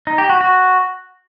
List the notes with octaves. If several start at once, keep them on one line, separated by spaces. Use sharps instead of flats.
D#4
G4
F#4
F#4